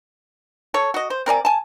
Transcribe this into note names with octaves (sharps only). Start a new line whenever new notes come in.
A4 C#5
F#4 D#5
C5
C4 A#4 D5 G#5
G#5 A5